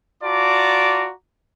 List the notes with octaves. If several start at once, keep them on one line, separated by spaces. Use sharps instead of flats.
F4 F#4 D5 A5 A#5 D6